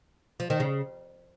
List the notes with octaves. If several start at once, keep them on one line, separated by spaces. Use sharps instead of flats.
F3
D#3
C#3